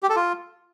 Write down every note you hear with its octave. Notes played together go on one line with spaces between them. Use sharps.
G4
A4
F4